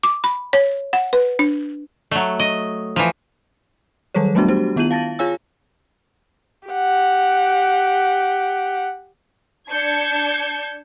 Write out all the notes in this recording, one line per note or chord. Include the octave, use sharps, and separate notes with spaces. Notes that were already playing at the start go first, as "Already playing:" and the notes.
D6
B5
C#5
F#5
B4
D4
F#3 A3
D#5
E3 F3
D#3 F#3 G3 G#4 A4 C#5
F#3 G3 A3 B3 D4 F#4
D4 F#4 G4 C5
D#3 B3 E4 F4 D#7 F#7
F5 A5 A6 A#6
F4 G#4 C#5 F5 G#5 E6
G4 F#5
D4 A5 G6 G#6 C#7